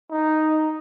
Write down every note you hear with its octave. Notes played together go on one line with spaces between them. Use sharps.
D#4